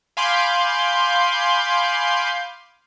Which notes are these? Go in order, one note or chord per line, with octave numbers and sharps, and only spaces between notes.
F5 G#5 B5 C6 D6 G6